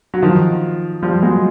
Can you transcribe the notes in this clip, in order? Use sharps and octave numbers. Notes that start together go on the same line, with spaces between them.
F#3
D#3 F3
F3 G3
F#3 G#3